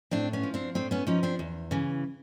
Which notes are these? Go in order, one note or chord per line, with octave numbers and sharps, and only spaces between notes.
A2 C4 D4
B3 C#4
F3
C4 D4
A2 C4 D4
B3 C#4
F3 C#4 D#4
C4 D4
E2
C#3 E3